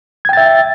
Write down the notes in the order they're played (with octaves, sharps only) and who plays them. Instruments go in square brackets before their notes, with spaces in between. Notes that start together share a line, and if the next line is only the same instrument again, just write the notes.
[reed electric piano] G#6
G5
A6
E5